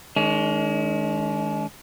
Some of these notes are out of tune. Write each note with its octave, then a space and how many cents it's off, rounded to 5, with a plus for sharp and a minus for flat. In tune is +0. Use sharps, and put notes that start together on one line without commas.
D#3 +0 G#3 +15 D4 -45